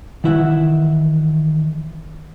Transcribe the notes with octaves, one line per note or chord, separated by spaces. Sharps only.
D#3 E3 E4 E5 F#5 G5